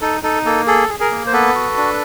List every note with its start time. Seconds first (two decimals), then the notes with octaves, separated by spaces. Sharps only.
0.01 D#4 A4
0.23 D#4 A4
0.45 A#3 A4
0.67 G#4 A4
0.89 G#4
1.00 G#4 A#4
1.11 A#3
1.26 C5
1.33 B3 A4 B4
1.55 F#4
1.77 D4